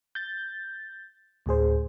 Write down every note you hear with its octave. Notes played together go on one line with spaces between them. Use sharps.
G6 A6
D2 A2 G#4 C5